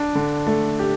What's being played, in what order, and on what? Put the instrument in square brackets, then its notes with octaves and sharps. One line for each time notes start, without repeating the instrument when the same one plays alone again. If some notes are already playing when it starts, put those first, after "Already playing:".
Already playing: [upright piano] D4
D3
A3
G4